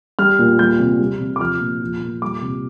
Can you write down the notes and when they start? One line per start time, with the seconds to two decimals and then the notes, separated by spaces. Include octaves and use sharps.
0.19 G3 F6
0.39 A#2
0.59 G3 G6
0.80 C3
0.99 G3
1.20 C3
1.36 D6
1.40 F3 F6
1.60 A#2
1.82 F3
2.01 A#2
2.22 G3 D6
2.42 C3